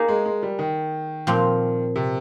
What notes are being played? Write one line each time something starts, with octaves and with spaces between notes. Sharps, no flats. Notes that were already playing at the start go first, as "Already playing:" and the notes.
Already playing: A#3 D#4 G#4
G#3
G#3
G3
D#3
A#2 F3 C4
C3